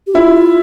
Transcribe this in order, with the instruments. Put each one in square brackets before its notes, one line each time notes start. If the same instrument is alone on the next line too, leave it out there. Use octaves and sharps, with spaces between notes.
[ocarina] G4
[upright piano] E4 [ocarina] F4